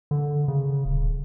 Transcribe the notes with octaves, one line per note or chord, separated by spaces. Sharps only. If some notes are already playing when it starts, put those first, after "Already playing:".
D3
C#3
D#1